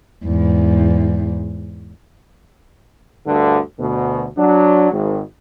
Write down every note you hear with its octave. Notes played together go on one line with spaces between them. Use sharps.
E2 G#2
D2 G2 D3
D2 B2
F#3 D4
G#1